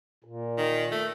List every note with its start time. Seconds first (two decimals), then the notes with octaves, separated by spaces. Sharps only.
0.24 A#2
0.58 D#3
0.91 A3